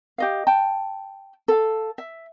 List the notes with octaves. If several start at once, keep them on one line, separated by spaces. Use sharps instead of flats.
G4 D#5 F5
G5 A5
A4 F5
E5